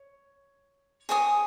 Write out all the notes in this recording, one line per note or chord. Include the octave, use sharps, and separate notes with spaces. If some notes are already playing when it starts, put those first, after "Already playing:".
Already playing: C#5
G#4 C#5 G#5 D#6